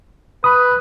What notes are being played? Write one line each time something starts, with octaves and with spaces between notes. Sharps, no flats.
B4 B5 D#6